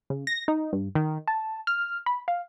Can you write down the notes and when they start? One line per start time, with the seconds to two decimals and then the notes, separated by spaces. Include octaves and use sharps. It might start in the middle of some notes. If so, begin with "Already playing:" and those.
0.10 C#3
0.27 A#6
0.48 D#4
0.73 G2
0.95 D#3
1.28 A5
1.67 F6
2.06 B5
2.28 F5